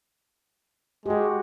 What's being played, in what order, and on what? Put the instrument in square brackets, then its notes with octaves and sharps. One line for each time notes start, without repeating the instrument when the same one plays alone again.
[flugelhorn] G#3 [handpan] F#4 G4